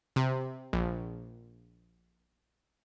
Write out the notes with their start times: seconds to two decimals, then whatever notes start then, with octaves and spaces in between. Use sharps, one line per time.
0.16 C3
0.73 A#1